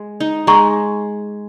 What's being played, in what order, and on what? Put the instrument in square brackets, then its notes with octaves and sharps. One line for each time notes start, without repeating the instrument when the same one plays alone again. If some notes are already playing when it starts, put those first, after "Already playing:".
Already playing: [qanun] G#3
D#4
[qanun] G#3 [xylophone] A#5 C#6